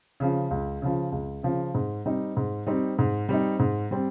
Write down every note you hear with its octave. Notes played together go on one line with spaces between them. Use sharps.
C#3 F3
C#2
C#3 F3
C#2
C#3 F3
G#2
G3 C4 D#4
G#2
G3 C4 D#4
G#2
G3 C4 D#4
G#2
G3 C4